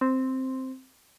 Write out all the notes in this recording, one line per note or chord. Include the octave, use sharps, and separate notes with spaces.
C4